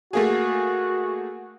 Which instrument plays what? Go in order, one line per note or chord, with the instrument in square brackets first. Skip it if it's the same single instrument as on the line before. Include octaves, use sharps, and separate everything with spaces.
[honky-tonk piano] A3 A#3 G#4 [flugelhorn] F#4